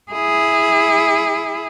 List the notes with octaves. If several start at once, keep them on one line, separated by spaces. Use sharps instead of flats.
E4 G#4